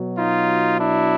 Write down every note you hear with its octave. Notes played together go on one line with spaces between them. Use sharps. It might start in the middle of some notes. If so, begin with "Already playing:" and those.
Already playing: B2 F#3
D#4 F4
D4 E4